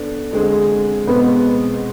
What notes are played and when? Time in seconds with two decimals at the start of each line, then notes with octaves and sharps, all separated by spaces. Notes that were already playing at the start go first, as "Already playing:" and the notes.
Already playing: B3 D4 A4
0.32 D3 G#3 C4 G#4
1.07 B2 G#3 B3 C4